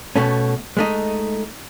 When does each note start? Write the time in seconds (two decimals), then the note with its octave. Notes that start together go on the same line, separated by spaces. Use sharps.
0.16 B2 A3 C#4
0.77 G#3 A3 D#4